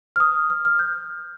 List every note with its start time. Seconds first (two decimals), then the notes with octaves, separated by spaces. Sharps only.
0.16 F6
0.20 D#6
0.50 F6
0.65 F6
0.79 G6